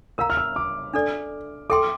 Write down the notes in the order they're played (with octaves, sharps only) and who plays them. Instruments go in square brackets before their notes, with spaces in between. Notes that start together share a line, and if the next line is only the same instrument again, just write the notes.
[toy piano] A#4 F5 A#5 [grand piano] E6
[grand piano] F6
E6
D6
[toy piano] D4 A4 D5
[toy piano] A4 E5 G5 C6 [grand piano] D6